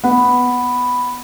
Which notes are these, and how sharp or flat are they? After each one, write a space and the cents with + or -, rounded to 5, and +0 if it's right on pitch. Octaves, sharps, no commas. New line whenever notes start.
B3 +0